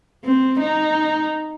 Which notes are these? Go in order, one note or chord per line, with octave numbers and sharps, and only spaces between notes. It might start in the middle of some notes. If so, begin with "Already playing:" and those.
C4
D#4